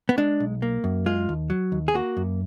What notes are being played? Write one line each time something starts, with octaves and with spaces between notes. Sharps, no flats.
B3
G#3 D4
B1
A#3
F#2
G#3 F4
D#2
F#3
D#2
G#4
A#3 F#4
F#2